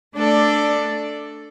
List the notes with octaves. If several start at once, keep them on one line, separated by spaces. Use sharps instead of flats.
A3 D4 A4 D5